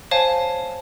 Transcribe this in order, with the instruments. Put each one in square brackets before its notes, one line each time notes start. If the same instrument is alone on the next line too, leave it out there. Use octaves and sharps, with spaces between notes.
[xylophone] C5 C#5 F5 G#5 A5